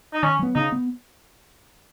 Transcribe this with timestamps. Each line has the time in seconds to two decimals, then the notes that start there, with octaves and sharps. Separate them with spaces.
0.13 D#4
0.23 D#3 C#4
0.39 F#3 B3
0.55 C#3 D#4
0.72 B3